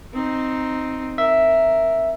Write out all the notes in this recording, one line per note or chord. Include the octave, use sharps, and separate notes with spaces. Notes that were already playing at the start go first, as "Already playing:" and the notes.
C4 D#4
A#4 E5